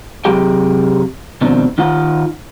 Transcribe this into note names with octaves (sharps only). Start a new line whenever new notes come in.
C3 F#3 G4 G#4 G5
B2 D#3 F3 C4 D4
D#3 D#4 F4 F#5